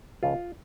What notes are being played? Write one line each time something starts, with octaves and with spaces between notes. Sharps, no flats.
C#2 C#3 F3 F4